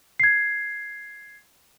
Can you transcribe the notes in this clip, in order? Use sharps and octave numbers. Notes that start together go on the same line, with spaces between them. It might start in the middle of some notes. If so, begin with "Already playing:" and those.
G#6 C7